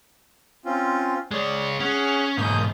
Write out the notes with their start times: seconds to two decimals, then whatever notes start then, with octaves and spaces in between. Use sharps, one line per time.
0.65 C4 C#4 F4
1.31 G#3 C#5 D5
1.80 C#4 G#4 C#5 F#5
2.37 B1 G#2 A#3 D#6 G6